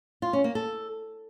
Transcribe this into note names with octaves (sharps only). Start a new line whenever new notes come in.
F4
C#4
A#3
A4